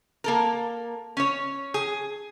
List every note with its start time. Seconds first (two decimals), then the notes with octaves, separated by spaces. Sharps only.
0.24 A#3 A4 A#4
1.17 C#4 C#5
1.74 G#4